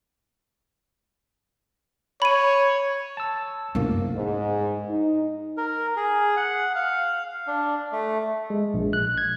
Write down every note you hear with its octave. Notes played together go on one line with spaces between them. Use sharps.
C#5 B5 D#7
A5 E6
C2 F#2 A#3 B3
G#2
D#4
A#4
G#4
F#5
F5
D4
A3
G#3
A#1
F#6
G#6